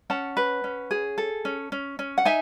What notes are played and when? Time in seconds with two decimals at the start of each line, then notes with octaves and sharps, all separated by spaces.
0.10 C#4 F#5 A5
0.37 B4
0.64 C#4
0.91 G#4
1.18 A4
1.45 C#4
1.72 C#4
1.99 C#4
2.18 F#5
2.25 D#4 E5 G#5